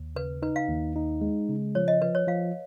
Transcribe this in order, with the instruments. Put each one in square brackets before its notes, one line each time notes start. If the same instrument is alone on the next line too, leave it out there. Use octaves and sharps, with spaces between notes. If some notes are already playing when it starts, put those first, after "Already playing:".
Already playing: [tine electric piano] D#2
[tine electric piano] C#3 [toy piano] B4
[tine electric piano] D#4 [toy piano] B4
[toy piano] F5
[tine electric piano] D#2
D#4
G#3
C#3
[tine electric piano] F3 [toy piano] C#5
[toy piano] D#5
[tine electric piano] F3 [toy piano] B4
[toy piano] C#5
[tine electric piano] F3 [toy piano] F5